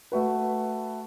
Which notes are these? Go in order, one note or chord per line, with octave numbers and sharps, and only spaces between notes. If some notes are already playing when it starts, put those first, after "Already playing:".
A3 F#4 B4